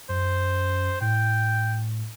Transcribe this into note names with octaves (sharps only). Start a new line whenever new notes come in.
F#2 C5
A2 G5